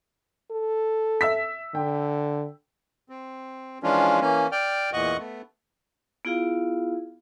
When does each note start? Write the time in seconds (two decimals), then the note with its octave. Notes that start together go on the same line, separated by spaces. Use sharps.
0.51 A4
1.21 E5 E6 B6
1.75 D3 G5
3.09 C4
3.83 E3 F3 G#3 C#4 D4 F4
4.21 E3 A#3 C#4
4.52 D5 G5 F6
4.93 E2 A#2 E3 D#5 F#5 C#6
5.18 A3 B3
6.25 B3 E4 F4 G#4 F5